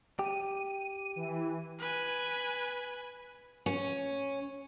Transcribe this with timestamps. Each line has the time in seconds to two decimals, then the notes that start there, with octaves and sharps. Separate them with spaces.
0.19 G4 D#7
1.16 E3
1.80 B4 G#5
3.66 C#4